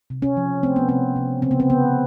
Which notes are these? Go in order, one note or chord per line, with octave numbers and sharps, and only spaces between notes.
C3
C#4
F3
A3 C4
B3
C3 C4
C3
C#3 C4
B3
C4
C#3 B3